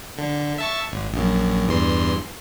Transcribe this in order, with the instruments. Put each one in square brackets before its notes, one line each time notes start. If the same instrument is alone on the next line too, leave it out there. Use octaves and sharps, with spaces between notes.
[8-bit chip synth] D3
E5 A5 C#6
G#1
A#1 F#2
E2 G2 C6